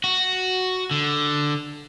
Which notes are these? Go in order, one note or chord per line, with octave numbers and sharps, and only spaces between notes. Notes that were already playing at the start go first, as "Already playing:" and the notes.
F#4
D3